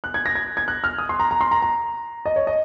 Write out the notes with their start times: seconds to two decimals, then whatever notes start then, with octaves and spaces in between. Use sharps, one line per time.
0.04 F#6
0.14 G#6
0.26 A#6
0.35 G#6
0.57 G#6
0.68 F#6
0.84 F6
0.98 D#6
1.09 C6
1.20 A#5
1.31 A#5
1.41 C6
1.51 A#5
1.62 A#5
2.26 D#5
2.36 C#5
2.47 D#5